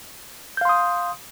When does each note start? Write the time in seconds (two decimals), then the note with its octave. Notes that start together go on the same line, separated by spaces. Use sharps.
0.57 G6
0.61 F5
0.65 C6
0.69 D#6